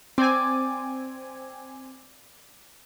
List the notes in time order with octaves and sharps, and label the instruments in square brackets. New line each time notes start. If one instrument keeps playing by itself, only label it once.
[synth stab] C4 G#5 [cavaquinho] D5